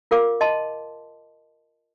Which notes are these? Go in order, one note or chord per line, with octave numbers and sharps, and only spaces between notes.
F4 A#4 F5 D6
D#5 A5 C6